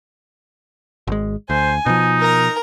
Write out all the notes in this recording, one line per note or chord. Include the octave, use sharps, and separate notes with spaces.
G#1 G#3
D2 C5 G#5
B2 F3 D#4
A#4 A#5